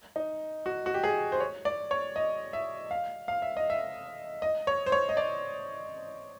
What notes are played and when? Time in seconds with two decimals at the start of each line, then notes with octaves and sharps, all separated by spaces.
0.16 D#4
0.66 F#4
0.86 F#4
0.94 G4
1.04 G#4
1.32 C5
1.40 C#5
1.65 D5
1.91 C#5
2.16 D#5
2.53 E5
2.91 F5
3.28 F5
3.42 E5
3.57 D#5
3.70 E5
4.42 D#5
4.67 C#5
4.86 C5
4.92 C#5
5.09 D#5
5.17 D5